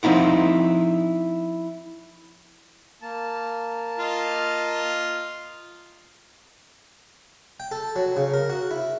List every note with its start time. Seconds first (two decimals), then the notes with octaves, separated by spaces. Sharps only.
0.03 F3 C4 D#4 E4 F#5
3.02 A#3 A5
3.99 F4 D#5 F6
7.60 G5
7.71 A4
7.96 F#3
8.17 C#3
8.34 A#4
8.50 F#4
8.71 E4